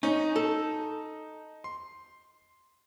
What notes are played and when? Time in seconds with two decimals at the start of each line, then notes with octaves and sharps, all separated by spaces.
0.03 C#4 D#4
0.36 A4
1.64 C6